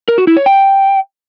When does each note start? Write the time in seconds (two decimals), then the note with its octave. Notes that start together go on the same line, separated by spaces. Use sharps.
0.08 A#4
0.18 F#4
0.27 E4
0.37 C#5
0.46 G5